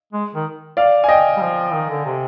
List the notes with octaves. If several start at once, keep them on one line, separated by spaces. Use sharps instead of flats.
G#3
D#3
D5 F5
G#5
D#5 G5
G3
F3
D#3
D3
C3